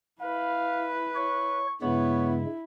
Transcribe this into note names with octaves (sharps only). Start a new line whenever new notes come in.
E4 B4 F5
C#5 C#6
G2 C#3 G#3 B3 E4 C#5